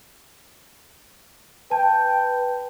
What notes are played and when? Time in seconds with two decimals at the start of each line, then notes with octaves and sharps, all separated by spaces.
1.71 B4 G5 A5